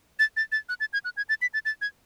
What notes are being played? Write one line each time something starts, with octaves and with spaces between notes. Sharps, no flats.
A6
A6
A6
F#6
A6
G#6
F#6
G#6
A6
B6
A6
A6
G#6